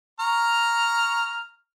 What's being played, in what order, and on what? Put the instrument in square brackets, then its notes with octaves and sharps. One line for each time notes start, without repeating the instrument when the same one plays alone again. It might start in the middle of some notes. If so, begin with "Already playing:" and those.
[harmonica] A#5 C#6 F6